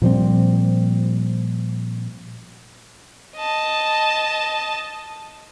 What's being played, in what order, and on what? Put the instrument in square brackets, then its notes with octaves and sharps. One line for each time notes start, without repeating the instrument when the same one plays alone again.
[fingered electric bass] A#2 F3 G3 C4
[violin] D#5 A5